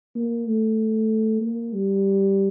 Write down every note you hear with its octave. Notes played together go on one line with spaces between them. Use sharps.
A#3
A3
A#3
G3